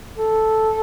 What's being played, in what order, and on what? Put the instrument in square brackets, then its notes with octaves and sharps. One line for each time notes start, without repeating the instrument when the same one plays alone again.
[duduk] A4